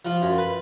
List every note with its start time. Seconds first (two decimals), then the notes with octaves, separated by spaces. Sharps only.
0.05 F3 F4
0.22 F#2
0.38 B4